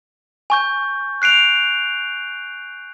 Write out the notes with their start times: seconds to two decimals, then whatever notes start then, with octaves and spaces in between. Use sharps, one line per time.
0.50 G#5 C#6 G6
1.22 F#6 C7 D7 F7